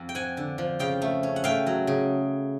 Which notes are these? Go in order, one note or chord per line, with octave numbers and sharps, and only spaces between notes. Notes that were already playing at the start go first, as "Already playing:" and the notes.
Already playing: F2
G5
F3 F#5 G#5
D3
F3
C#3 F5 G5
A3
C#4
F#5
A3 F5 G5
F#3
C#3